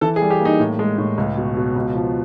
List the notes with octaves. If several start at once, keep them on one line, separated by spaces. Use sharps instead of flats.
E3 A4
G#4
G3
G4
A#3
D#4
A2
G#3
A2
C#2
B2
B2
C#2
F3